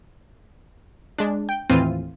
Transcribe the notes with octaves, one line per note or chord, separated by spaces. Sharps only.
G#3 D4
G5
D#2 A2 E3 C4 F4 D#7